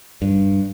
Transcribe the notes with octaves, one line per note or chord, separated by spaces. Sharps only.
G2